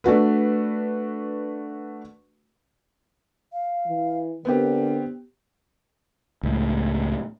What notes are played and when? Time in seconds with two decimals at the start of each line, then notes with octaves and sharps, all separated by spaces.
0.04 A3 D4 F#4 B4
3.53 F5
3.87 E3
4.45 D3 B3 C4 G4 A#4
6.43 C#2 A2